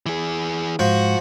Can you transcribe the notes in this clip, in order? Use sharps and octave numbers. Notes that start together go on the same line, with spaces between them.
E3 G#4
G#2 F3 F#4